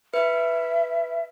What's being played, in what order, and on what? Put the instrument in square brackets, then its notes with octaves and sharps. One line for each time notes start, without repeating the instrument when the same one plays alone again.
[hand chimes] B4 [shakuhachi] E5